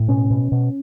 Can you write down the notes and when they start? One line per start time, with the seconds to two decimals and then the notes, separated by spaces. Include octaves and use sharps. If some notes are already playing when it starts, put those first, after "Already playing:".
Already playing: A2
0.08 B2 C#4
0.30 B2
0.52 B2